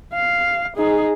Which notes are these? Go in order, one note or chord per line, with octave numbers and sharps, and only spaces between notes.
F5
D#4 G#4